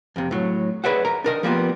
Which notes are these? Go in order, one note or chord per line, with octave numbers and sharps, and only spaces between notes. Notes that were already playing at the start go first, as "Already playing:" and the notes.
F2 C3
A2 F#3
G#4 B4 C#5 D5 E5 F#5
A#4 C#5 A#5
D4 A#4 D#5
F3 G3 A#3 B3 F4